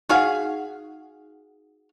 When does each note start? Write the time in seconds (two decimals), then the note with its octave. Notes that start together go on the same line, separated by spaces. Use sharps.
0.09 D#4 F#4 G#4 F5 F#5